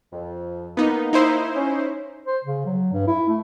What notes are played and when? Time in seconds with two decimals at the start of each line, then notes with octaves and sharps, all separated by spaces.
0.12 F2
0.77 A#3 B3 D#4
1.13 D#4 E4 C5
1.55 C#4
2.26 C5
2.44 C#3
2.66 F#3
2.93 G2
3.07 E4
3.28 A3